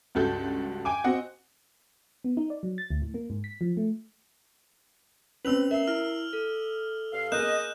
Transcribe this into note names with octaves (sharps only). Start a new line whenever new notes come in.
C#2 G2 F#4 A4 G6
G5 G#5 D6
C4 F#4 D#5 F#5
B3
D#4
D5
F#3
A6
D2
A2
A#3
G#2
B6
F3
A3
C4 C#4 B4 E6 F7 F#7
A#4 E5 C7
E4 F6
A4
G2 F5
A#3 G#4 D#5 F#6 G6 E7